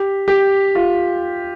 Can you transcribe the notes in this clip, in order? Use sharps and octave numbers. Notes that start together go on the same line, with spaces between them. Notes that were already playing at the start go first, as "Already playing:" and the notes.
Already playing: G4
G4
F4